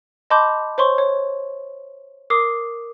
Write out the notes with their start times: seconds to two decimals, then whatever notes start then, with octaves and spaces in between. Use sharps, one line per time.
0.30 D#5 A5 B5 C6 D6 G6
0.78 C5 C#5 C6 C#6
0.98 C#5
2.30 A#4 D6 D#6 C7